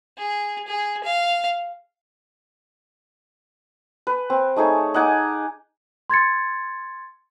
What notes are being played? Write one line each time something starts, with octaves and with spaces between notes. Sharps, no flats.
G#4
G#4
F5
B4
C4
A3 D#4 G#4 C#5
D#4 F#5 G#5 D6
C6 G#6 A6 C#7